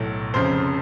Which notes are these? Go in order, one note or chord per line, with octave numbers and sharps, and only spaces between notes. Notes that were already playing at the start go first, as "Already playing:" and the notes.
Already playing: B1 A2 F#3 A3
F1 F2 C#3 C5